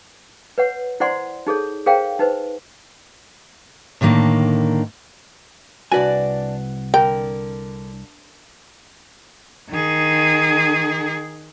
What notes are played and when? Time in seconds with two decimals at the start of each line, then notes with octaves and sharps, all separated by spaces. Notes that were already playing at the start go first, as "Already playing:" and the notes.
0.58 B4 C#5 F#5
1.00 E4 C5 D5 F#5 C6
1.47 D#4 G#4 A4 C#5
1.86 G#4 A#4 C5 C#5 F5 G5
2.19 D#4 B4 C5
4.01 A2 D3 D#3 A#3
5.92 C2 D4 F#4 B4 D5 G#5
6.94 D3 A#4 G5
9.70 D#3 G#4